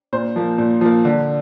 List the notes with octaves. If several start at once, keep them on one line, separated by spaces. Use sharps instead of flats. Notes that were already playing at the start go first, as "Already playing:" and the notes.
A#2 C5
F3 A#3
A#2
F3 A#3
D3